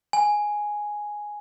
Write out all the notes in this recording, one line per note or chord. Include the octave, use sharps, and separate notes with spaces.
G#5